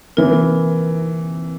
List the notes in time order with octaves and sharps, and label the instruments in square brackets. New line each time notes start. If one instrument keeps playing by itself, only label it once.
[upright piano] C3 E3 A#3 [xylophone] A#4